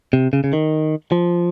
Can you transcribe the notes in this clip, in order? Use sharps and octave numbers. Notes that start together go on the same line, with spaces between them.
C3
C#3
C#3
D#3
F3